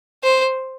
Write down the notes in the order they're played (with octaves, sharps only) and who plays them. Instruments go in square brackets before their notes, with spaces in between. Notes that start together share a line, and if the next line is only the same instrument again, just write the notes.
[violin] C5